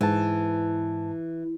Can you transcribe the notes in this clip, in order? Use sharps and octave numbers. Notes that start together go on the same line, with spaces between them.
G#2 E3 A5